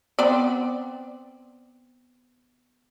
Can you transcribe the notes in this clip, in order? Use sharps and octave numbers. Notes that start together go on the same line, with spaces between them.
B3 C4 D5